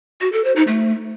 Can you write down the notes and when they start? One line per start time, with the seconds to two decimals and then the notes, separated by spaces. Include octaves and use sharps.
0.21 F#4
0.33 A4
0.44 C5
0.56 D#4
0.67 A3